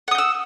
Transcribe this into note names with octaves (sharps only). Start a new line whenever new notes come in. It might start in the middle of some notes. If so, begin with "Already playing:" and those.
F#5 D#6 E6 G6